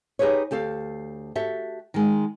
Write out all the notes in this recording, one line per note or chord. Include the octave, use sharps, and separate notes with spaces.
D#4 G4 G#4 B4 C#5
D2 G4 A4 F5
F#4 G4 A4 E5
D#3 G#3